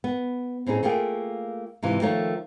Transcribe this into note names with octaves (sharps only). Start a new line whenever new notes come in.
B3
A2 C4 C#4 D#4 G#4
A3 A#3 F4 G#4 G5
G#2 C3 E3 F4
D#3 F3 A3 A#3 F4 C#5